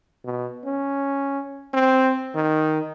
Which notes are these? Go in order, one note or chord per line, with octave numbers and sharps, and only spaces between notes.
B2
C#4
C4
D#3